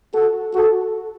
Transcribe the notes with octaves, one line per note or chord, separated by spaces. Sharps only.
F#4 A4
F#4 A4